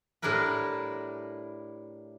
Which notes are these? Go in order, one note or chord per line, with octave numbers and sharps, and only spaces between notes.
A2 G3 D4 E4 A#4 B4